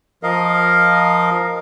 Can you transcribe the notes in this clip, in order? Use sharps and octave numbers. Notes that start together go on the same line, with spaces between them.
F3 A#4 D#5 F5